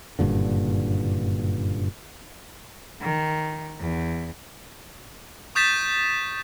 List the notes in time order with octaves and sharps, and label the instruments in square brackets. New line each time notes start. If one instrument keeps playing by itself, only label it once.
[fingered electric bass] F#1 G2 A#2 D3
[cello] D#3
E2
[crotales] C#6 D#6 G6 A6 B6 E7